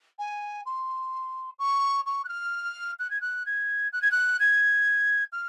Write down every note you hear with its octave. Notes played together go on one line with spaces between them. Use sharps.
G#5
C6
C#6
C#6
F#6
F6
F#6
G#6
F#6
G#6
F#6
G#6
F#6
G#6
F6